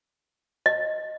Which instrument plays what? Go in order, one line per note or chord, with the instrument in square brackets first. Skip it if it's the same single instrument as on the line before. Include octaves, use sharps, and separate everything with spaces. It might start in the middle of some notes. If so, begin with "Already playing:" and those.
[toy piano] D#5